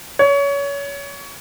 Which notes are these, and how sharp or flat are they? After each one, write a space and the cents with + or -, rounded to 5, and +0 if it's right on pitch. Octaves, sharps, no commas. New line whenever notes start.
C#5 +25